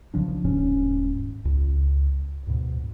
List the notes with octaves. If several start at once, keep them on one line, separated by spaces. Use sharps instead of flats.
B1 C#3 F3 D4
D#1 G#2 C#4
C#2
D2 G#2 B2